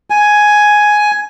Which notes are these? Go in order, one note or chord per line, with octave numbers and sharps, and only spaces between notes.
G#5